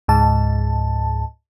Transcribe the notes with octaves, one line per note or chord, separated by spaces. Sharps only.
C#2 G#2 A5